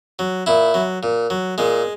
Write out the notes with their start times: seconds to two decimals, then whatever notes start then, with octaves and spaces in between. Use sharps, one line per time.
0.19 F#3
0.46 A#2 E4
0.74 F#3
1.03 A#2
1.30 F#3
1.58 A#2 G#3